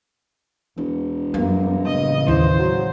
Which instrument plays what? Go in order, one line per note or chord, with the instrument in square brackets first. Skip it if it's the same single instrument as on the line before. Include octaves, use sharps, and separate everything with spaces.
[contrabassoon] E1 [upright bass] E2
[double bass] F#2 A#3 [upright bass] G3
[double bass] A1 C#3 [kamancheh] D#5
[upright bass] D#2 [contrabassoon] E3 [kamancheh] C5
[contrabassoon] F#3